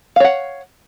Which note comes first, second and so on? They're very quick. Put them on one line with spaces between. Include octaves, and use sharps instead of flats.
F5 C#5 F#5